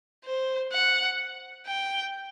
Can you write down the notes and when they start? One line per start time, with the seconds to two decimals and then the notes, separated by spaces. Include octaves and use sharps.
0.25 C5
0.72 F#5
1.67 G5